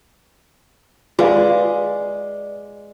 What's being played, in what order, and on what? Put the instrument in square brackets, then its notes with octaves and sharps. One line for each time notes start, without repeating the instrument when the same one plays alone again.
[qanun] G#3 [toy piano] F4 B4 F5 [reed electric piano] D5